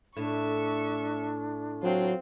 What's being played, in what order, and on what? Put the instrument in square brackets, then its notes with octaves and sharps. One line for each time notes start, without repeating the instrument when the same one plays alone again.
[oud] A2 [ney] D4 [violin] E5 C#6
[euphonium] F#3 [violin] C4 F4